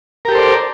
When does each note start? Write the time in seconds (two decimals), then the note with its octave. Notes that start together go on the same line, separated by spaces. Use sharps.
0.25 A#4
0.28 G4
0.32 A4
0.35 C5
0.38 D5